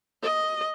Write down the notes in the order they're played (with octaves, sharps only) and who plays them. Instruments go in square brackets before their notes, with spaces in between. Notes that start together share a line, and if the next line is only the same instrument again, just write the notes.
[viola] D#5